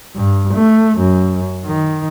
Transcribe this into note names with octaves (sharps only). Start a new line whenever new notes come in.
G2
A3
F#2
D#3